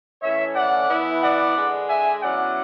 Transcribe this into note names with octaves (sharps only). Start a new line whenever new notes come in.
E3 A3 C#4 E4 C#5 E5
D5 F#5
E3 B3 E4
D5 F#5
D3 G#3 D4
E5 G#5
B2 F#3 C#4 E4 D5 F#5